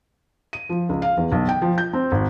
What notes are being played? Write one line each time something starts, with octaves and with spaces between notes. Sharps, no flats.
D#7
F3
C#2
F5
E2
B1
G5
F3
G6
C4
G#1